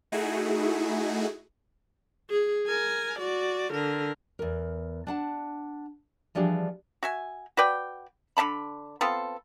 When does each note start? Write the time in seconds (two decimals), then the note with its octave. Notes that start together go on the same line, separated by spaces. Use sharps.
0.12 A3 D#4 E4 F#4 G#4
2.30 G#4
2.66 A#4 G#5
3.19 F#4 D5
3.73 D3 A#4
4.39 E2 A#4
5.07 D4 F#5 A5
6.35 E3 F3 G3 D4 G4 G#4
7.03 F#4 E5 G#5
7.57 F#4 B4 D5 G5
8.37 D3 E5 A5 B5
9.01 B3 C4 F4 A4